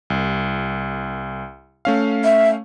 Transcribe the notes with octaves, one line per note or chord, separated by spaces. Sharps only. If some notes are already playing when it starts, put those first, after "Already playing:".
C2
A3 C#4 F5
E5